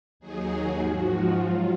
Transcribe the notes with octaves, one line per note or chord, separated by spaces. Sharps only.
D#2 D#3 F#3 G#4
G#4
G#2 F3 F#4
F4
G#2 F#3